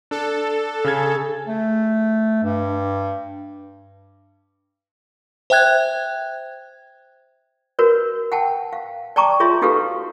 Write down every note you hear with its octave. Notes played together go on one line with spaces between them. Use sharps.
D4 A4
C#3 G#4 F6 G#6
A3
G2
C5 E5 G5 F#6 G#6
F#4 A#4 B4 C#5
F#5 G5 A5
F5
D5 G5 A5 A#5 C#6 D6
F4 G#4 C#5 E5 C6
D#4 F#4 G4 A4 B4 F5